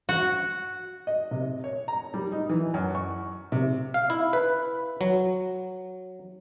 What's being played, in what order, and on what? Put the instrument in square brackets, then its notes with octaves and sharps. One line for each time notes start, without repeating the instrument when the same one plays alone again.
[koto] F#4
[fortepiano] D#5
C3
C#5
A#5
G3
D#4
E3
F#2
C#6
C3
[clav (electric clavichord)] F5
E4
B4
F#3